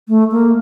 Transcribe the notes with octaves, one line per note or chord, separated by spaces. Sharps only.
A3
A#3